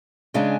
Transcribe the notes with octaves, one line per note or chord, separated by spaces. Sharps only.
C#3 G#3 D4 G#4